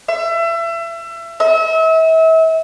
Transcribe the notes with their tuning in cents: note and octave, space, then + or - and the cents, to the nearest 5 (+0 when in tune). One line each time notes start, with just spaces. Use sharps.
E5 +30
E5 -35